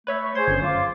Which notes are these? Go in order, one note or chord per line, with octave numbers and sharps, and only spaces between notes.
A3 B4 C#5 E5
C#6
G#4 C5 C#5 C6 G#6
G1 C#4
F#2 F4 F5 C6 D6